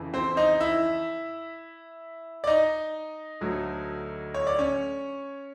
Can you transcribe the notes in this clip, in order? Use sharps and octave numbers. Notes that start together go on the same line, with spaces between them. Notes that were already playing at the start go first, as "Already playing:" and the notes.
Already playing: F2 C#3 E3
C4 C5
D#4 D#5
E4 E5
D5
D#4 D#5
D2 D3 F#3 A3
C#5
D5
C#4 C#5